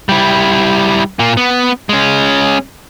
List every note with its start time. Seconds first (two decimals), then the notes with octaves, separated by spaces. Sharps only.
0.09 G3 E4
1.19 A#2 A#3
1.37 B3
1.89 G#3 C#4